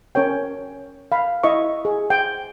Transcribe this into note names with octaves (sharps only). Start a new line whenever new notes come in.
C#4 A#4 C#5 G5
F5 B5
E4 D#5 E5 C#6
G#4
G5